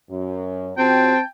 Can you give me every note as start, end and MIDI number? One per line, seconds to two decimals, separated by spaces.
0.11 0.73 42
0.78 1.15 49
0.78 1.20 60
0.78 1.15 65
0.78 1.15 66
0.78 1.24 79
0.78 1.24 81